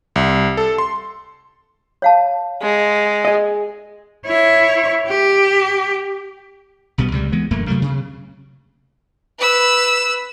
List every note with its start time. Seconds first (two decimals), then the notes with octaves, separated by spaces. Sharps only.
0.16 C2
0.57 A4
0.78 C6
2.02 C#5 F5 A5
2.62 G#3
3.25 G#4 D#5
4.26 E4 C#5
5.08 G4
6.98 B1 B2 G3 B3
7.12 C#2 C3 G3
7.32 E3 G#3 B3
7.51 E1 F#2 A3 A#3
7.67 C3 F#3 A3 A#3
7.82 C3
9.39 B4 E6